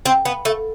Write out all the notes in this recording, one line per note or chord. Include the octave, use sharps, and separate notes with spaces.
C4
B3
A3